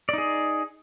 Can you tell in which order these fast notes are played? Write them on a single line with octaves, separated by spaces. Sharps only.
D5 D#4 G#4